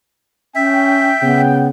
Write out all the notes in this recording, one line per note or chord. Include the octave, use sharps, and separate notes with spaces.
C#4 E5 G5
C#3 B3